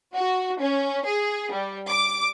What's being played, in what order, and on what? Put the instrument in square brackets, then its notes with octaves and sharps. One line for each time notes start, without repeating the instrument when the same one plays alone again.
[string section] F#4
C#4
G#4
G3
D6